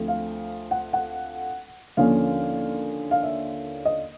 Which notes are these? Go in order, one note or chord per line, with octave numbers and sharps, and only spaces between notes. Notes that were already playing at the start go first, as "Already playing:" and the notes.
Already playing: D2 F3 A3 C4
F5
F#5
F#5
D#2 D3 F3 A#3 C#4 F5
F5
E5
D#5